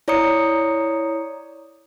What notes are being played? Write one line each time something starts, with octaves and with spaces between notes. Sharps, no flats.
E4 C#5 D5 A#5 D#6 C#7